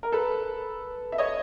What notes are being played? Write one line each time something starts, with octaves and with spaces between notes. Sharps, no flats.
A#4
A4 B4
E5
C#5 D#5